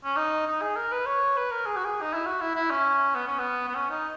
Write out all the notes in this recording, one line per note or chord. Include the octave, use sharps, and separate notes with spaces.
C#4
D#4
D#4
G#4
A#4
B4
C#5
B4
A#4
G#4
F#4
G#4
D#4
E4
F#4
E4
E4
C#4
B3
C#4
B3
B3
C#4
D#4